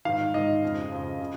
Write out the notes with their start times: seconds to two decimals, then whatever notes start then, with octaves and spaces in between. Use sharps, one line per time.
0.05 G#2 D#3 F5
0.34 G#2 D#3 D#5
0.62 F2 C#3
0.92 F2 C#3
1.20 C#3